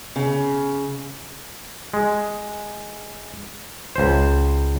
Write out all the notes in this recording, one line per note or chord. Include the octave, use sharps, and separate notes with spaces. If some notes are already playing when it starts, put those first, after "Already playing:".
C#3
G#3
C#2 C5